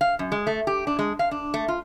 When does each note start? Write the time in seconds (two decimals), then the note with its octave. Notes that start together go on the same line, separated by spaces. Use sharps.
0.01 F5
0.19 F#2
0.32 G#3
0.47 A3
0.67 G4
0.87 D4
0.99 G#3
1.19 F5
1.31 D4
1.54 A3
1.68 F4